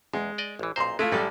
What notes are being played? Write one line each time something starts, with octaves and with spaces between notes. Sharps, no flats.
E2 G#3
D5 D#5
A1 E3
B1 A#2 C5 A#5 C6
G#3 A3 E4 F4
A1 G3 A4